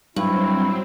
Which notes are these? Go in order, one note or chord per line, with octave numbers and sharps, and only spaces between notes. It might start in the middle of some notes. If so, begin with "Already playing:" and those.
G2 F#3 C4 E4